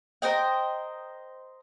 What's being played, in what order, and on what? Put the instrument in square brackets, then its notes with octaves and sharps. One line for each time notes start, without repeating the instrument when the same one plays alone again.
[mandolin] A#4 C5 D#5 G5